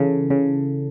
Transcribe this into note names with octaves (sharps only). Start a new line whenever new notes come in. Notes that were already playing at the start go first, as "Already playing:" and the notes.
Already playing: C#3 E3 A4
C#3